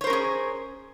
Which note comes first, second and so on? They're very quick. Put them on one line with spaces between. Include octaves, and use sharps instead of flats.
C#5 C5 A#4 C#4 G#4